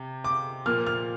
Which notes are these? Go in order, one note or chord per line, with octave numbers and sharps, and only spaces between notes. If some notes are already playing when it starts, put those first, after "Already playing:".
Already playing: C3
D6
A#2 F3 A#3 F6
F6